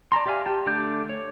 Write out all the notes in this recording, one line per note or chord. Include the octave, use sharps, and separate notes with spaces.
D5 A5 A#5 C6
G4 D5 E5 F5 G#5
G4 A5
D3 A3 D4 D5 G6
C#5